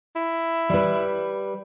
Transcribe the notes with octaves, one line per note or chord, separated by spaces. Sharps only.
E4
G3 B4